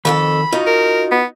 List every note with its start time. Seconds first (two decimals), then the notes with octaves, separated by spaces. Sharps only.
0.05 F2 D#3 F4 A4 B5
0.53 D#4 F4 F#4 D#5
0.67 A#4
1.11 B3